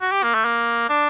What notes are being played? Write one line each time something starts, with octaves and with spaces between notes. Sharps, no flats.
F#4
G4
A#3
A3
A#3
D4